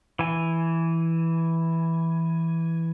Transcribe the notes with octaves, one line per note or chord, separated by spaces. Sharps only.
E3 G#5